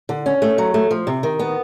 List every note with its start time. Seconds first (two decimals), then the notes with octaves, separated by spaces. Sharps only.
0.09 D3
0.26 C#4
0.42 A3
0.58 F#3
0.74 A3
0.91 F3
1.07 C3
1.23 D#3
1.39 B3